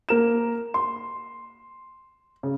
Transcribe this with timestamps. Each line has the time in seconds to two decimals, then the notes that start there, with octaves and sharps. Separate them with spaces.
0.09 A#3 A#4 E7
0.74 C6
2.43 C#3